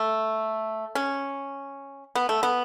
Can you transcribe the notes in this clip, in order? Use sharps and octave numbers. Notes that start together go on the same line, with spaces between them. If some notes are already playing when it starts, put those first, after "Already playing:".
Already playing: A3
C#4
B3
A3
B3